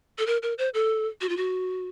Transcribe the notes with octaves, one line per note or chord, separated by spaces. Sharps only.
A4
A#4
A#4
C5
A4
F#4
F4
F#4